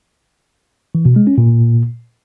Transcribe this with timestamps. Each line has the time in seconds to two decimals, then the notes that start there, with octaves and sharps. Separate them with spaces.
0.95 E3
1.05 B2
1.16 G#3
1.27 C#4
1.38 A#2